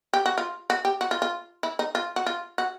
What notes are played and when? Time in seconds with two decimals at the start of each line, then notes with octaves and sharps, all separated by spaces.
0.13 G4
0.26 F#4
0.38 F4
0.70 F#4
0.85 G4
1.01 F#4
1.11 F4
1.22 F4
1.63 E4
1.79 D#4
1.95 F4
2.16 F#4
2.26 F4
2.58 F#4